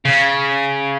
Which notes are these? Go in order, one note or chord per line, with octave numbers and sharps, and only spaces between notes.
C#3